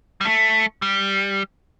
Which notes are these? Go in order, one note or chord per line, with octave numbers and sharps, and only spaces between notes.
G3
A3
G3